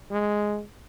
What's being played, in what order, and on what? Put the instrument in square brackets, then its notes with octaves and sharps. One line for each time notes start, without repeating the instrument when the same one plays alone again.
[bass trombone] G#3